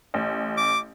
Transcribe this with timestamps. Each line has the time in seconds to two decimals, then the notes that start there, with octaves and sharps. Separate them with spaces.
0.14 A1
0.57 D6